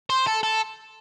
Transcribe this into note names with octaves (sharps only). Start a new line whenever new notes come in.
C5
A4
A4